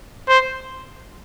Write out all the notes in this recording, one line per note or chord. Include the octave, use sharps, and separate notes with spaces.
C5